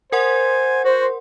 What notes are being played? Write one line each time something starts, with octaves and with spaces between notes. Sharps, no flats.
A#4 C5 F#5 G#5 C6
F#4 C5